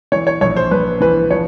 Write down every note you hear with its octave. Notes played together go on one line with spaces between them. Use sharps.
E3 C#5
C#5
A#1 C#5
C5
A#1 B4
E3 B4
F3 C#5